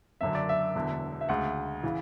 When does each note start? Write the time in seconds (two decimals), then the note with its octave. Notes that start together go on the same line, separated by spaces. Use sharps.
0.21 F#1 F#2 D3 F#3 E5
0.35 D5
0.49 E5
0.75 E1 E2 D3
1.21 E5
1.29 D2 C#3 G#3 F#5
1.83 C#3 E3